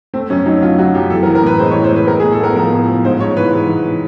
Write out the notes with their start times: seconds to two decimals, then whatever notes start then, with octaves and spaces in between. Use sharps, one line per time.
0.14 A3 C4
0.30 F#2 C#4
0.46 F#3 D#4
0.62 D3 F4
0.78 F#3 F#4
0.94 F#2 G4
1.10 E3 A4
1.23 A#4
1.27 E3
1.35 A#4
1.43 A2 B4
1.59 G#3 C5
1.71 C#5
1.75 E3
1.84 C5
1.91 G#3 B4
2.07 G#3 A#4
2.20 G#4
2.24 A2
2.32 A4
2.40 B3 A#4
2.56 F3 A#4
2.72 A2
2.88 F3
3.04 G#2 C5
3.20 G#2 C#5
3.36 E3 B4
3.53 G#2
3.69 E3